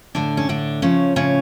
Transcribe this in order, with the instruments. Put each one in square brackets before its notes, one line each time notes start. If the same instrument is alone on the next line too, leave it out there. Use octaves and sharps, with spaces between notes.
[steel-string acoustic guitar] A2 D3 D4
C#4
A2 D3 D4
C#3 F3 C#4
A2 C#3 C#4